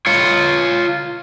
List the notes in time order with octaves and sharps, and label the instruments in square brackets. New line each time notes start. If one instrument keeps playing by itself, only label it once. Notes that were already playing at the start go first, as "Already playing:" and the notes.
[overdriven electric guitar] F4 C#5